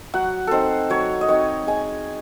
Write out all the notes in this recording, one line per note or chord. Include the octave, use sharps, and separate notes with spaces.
F#3 F#5
C4 D#4 A4 C5
F#3 C#5
D#5
C4 D#4 C#5
G#3 G#5